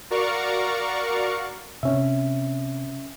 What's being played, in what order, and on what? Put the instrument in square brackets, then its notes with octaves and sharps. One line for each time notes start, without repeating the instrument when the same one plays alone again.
[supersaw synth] F#4 A#4 D5 F5 A#5 C#6
[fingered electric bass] C3 [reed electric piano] C#4 E5